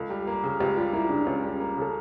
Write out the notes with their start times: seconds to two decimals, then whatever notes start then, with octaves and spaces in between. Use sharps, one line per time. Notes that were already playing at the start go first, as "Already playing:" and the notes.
Already playing: C#2 A4
0.10 G3
0.27 A#3
0.43 C#3
0.60 C#2 G4
0.77 G3 F4
0.93 A#3 E4
1.10 C#3 D4
1.27 C#2 C#4
1.44 G3
1.60 A#3
1.77 C#3 A4